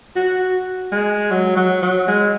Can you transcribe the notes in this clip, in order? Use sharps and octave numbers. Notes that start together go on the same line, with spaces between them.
F#4
G#3
F#3
F#3
F#3
G#3